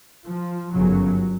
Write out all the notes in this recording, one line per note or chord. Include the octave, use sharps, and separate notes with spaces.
F3
G1 F#2 C#3 F#3